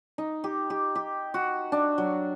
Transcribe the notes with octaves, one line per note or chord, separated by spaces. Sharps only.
D#4
G4
G4
G4
F#4
D4
F#3